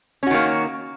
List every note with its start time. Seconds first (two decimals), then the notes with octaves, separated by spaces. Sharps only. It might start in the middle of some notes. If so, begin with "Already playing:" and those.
0.23 C#4
0.27 F#4
0.30 D#3
0.34 A#3